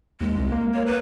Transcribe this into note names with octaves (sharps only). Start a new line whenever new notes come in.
D#2 G#3
C2
A#3
A#3 C#5
B4